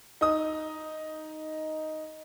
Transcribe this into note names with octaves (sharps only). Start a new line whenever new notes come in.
D#4 D#6